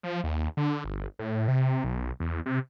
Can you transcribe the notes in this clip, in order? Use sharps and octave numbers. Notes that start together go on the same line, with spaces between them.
F3
D#2
D3
G1
A2
C3
B1
E2
C3